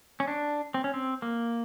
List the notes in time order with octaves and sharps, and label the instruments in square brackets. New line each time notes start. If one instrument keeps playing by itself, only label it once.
[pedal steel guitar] C#4
D4
C4
C#4
C4
A#3